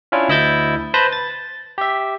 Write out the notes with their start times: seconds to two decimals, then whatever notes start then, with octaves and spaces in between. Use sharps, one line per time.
0.12 C#4 D4 E4 F4
0.29 D2 E4 D#5 E6 G6 A6
0.94 B4 C5 A5 B5 G6 A#6
1.12 A6
1.78 G4 E5